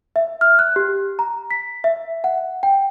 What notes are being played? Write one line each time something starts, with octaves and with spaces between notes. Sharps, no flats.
E5
F6
F#6
G4
A#5
B6
E5
F#5
G5